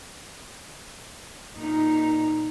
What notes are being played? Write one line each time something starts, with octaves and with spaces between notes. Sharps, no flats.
A#2 D#4